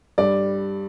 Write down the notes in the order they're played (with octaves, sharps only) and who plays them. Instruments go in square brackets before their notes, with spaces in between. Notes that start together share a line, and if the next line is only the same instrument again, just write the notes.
[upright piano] G2 G3 D5